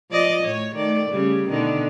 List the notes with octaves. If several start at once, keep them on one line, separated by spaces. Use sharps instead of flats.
F3 D5 D#5
A2 C#5
D#3 A3 D5
C#3 G3 A3
B2 D3 D#3